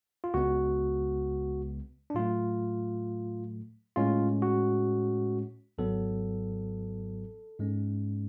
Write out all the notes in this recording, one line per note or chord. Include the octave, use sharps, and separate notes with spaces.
F4
C#2 C#3 G#3 B3 F#4
D4
A2 F#3 A3 F4
A2 G#3 C#4 F4
F#4
G#1 G#2 F#3 B3 A4
G#2 G#3 C#4